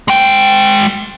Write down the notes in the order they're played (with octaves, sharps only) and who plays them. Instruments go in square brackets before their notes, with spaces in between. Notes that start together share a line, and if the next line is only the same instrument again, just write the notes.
[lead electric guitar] G#3 G5